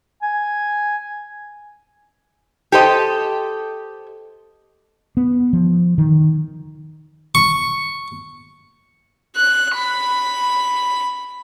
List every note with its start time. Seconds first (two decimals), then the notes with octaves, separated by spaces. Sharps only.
0.22 G#5
2.72 G4 A4 C5 D#5
5.17 B3
5.53 F3
5.98 D#3
7.35 C#6
9.36 F#6
9.74 B5